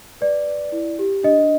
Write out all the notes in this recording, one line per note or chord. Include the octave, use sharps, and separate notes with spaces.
B4 D5
B4
E4
G4
D4 D#5